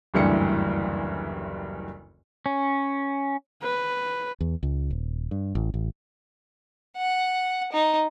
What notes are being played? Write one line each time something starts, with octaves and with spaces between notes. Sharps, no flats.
F#1 D2 G2 E3 G3 C#7
C#4
B4
E2
C#2
D#1
G2
A1
A1
F#5
D#4